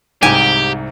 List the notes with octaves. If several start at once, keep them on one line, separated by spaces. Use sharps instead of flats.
C2 G#2 G4 G#5